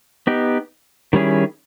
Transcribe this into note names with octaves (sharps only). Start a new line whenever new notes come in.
B3 D#4 G4
D#3 G3 C#4 E4 G#4